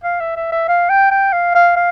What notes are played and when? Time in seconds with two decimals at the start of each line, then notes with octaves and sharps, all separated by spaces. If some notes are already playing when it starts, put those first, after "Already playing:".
0.04 F5
0.20 E5
0.36 E5
0.52 E5
0.68 F5
0.89 G5
1.11 G5
1.33 F5
1.55 F5
1.76 F5